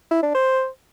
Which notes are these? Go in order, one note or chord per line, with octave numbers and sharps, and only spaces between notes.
E4
D4
C5